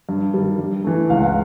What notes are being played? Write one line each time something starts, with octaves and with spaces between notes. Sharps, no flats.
G2
D#3 G3
G2
E3 A3
C#2 F5
F#5
F5